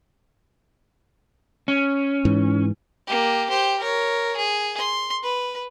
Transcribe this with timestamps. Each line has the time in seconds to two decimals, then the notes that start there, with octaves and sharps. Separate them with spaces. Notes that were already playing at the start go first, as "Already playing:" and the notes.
1.68 C#4
2.25 G#2 E3
3.07 A#3 G4
3.50 G4 C5
3.79 A#4 C#5
4.37 G#4
4.78 C6
5.23 B4